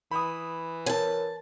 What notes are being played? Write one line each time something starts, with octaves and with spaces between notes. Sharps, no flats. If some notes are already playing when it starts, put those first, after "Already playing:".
E3 B5 D#6
A#4 B4 C#5 G#5 A5